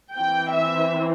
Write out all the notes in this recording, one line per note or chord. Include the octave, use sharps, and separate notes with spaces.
E3 C4 G5
E5